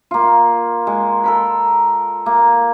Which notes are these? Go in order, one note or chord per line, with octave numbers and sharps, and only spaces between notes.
A#3 F4
G#3
A4 A#4 B5
A#3